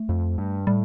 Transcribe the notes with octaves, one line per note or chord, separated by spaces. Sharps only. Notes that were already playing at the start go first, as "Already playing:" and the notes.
Already playing: A3
F2
G2
A2 G3